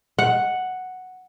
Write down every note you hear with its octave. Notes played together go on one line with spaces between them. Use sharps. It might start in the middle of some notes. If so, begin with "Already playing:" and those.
F#5